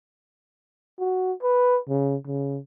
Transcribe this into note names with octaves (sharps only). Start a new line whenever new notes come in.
F#4
B4
C#3
C#3